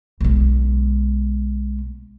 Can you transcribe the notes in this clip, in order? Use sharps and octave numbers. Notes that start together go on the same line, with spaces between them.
B1 G#3